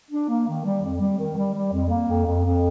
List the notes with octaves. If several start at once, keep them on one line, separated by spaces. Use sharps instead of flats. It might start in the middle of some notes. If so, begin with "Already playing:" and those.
D4
A#3
D#3
G3
F2
G3
D#3
G3
G3
F2
A#3
F2
F2
F2